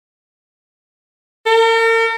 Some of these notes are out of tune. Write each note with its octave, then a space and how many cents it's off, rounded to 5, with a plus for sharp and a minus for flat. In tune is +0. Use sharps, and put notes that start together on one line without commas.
A#4 -45